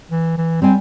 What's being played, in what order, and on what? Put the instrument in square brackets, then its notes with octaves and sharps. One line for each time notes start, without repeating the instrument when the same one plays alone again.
[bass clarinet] E3
E3
[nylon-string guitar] G3 G#5 [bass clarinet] C4